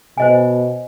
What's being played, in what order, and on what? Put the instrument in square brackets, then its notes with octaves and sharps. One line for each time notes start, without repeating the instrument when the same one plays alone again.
[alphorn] B2 [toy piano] C5 D#5 G#5